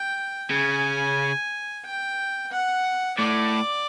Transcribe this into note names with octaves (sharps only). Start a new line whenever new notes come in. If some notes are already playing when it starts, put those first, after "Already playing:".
Already playing: G5
C#3 G#5
G5
F#5
A2 D5